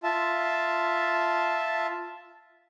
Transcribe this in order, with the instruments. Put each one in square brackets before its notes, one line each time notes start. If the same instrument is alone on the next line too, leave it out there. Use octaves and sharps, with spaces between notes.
[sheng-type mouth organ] F4 E5 A5